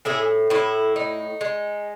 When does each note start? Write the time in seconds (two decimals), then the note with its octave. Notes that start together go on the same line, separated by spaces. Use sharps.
0.05 A2 E4 G#4
0.50 A2 E4
0.96 D#4
1.41 G#3